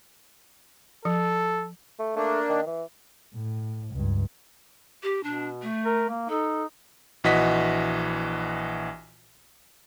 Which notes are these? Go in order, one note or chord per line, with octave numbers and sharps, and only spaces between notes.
F3 A4
A3
A3 A#3 D4
D#3
E3
A2
C#2 G2
G4
B2 D4
A3
A#4
A#3
D#4 A4
A#1 E3 F#4 D#5 B6